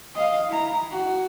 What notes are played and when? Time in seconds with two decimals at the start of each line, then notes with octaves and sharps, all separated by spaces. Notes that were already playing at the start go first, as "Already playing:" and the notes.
0.15 D#5 F5
0.49 E4 A#5
0.91 F#4